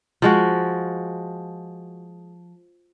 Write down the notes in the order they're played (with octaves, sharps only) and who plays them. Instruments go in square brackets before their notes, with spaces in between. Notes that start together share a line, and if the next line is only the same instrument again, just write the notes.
[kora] F3 G#3 F#4